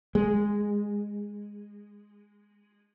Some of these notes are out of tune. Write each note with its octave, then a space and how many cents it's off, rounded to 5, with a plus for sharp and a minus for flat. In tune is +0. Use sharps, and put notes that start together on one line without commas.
G#3 -10